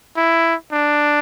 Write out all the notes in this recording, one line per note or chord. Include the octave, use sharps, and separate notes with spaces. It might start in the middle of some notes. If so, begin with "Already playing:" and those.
E4
D4